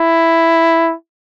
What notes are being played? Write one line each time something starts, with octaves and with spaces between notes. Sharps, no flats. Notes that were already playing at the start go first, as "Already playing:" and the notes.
Already playing: E4